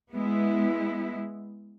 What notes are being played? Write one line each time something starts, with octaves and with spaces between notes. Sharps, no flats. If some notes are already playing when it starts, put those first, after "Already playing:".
G#3 B3 E4